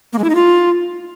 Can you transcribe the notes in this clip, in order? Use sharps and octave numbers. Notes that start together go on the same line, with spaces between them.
A#3
G#3
E4
D#4
F4